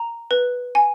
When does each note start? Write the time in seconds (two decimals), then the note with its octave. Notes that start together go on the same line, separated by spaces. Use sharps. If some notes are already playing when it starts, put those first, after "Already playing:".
Already playing: A#5
0.31 B4
0.75 G#5